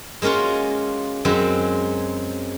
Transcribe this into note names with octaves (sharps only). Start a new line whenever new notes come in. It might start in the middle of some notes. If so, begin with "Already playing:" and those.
G#3 A#3 C#4 F4 F#4
F#2 F#3 G#3 C4